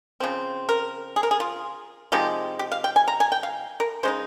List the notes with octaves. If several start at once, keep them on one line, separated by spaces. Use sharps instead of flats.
C#3 F3 C4
A#4
G#4
A#4
G#4
F4
C3 F3 G#3 D#4 G4
G4
F5
G5
G#5
A#5
G#5
G5
F5
A#4
C#3 G#3 D#4 C5